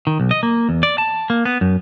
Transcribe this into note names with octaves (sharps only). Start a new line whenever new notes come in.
D#3
B1
D#5
A#3
E2
D5
A5
A#3
B3
F#2